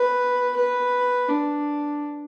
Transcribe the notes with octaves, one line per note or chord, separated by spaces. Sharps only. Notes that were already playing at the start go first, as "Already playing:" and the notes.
Already playing: B4
B4
D4